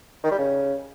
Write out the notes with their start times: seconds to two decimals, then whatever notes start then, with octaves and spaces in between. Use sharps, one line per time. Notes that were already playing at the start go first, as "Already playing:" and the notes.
0.24 D#3
0.31 G3
0.39 C#3